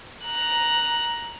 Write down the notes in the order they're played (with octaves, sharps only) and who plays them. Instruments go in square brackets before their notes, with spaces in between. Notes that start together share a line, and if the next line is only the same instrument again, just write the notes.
[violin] A#5 F#6